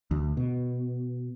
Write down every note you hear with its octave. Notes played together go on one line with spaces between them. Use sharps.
D2
B2